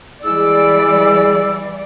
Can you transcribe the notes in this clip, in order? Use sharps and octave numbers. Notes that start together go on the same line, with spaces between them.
E3 G3 G#3 E4 G#4 D5 E6